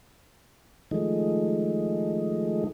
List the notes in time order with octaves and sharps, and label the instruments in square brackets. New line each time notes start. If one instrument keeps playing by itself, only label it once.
[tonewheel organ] D#3 F3 G#3 A3 D#4